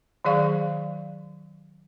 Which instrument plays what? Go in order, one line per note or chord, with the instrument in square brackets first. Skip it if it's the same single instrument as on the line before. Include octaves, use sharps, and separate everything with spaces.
[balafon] D#3 F#3 G#4 D5 F5 C#6